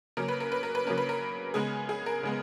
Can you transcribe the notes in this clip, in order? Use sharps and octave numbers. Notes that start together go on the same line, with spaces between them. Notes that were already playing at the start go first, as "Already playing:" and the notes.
C#3 F#3 A#3 C#4 A#4
B4
A#4
B4
A#4
B4
C#3 F#3 A#3 C#4 A#4
B4
A#4
C#3 G#3 B3 G#4
G#4
A#4
C#3 G#3 B3